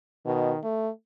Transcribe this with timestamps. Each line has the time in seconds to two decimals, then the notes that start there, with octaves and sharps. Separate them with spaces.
0.26 B2 D#3
0.63 A3